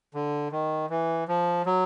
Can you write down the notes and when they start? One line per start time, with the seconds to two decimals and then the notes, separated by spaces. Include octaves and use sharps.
0.14 D3
0.52 D#3
0.90 E3
1.28 F3
1.66 F#3